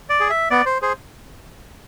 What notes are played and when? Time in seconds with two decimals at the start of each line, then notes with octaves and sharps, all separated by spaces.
0.09 D5
0.20 G#4
0.30 E5
0.51 B3 D5
0.66 C5
0.82 G#4 C5